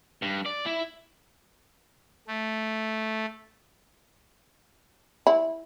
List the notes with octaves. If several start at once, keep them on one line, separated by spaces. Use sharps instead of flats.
G2
D5
E4
A3
E4